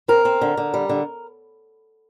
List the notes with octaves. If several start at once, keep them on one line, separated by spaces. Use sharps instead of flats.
C4 A#4
C4
D3
D3
G3
D3